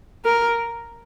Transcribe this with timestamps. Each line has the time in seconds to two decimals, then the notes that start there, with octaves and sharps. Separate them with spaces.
0.25 A#4